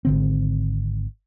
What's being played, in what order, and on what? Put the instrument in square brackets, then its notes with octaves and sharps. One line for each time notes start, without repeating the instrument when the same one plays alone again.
[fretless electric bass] G#1 D3 C4